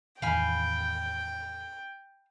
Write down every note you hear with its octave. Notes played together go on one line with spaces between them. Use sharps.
E2 A2 D#3 F5 G5 G#5 B5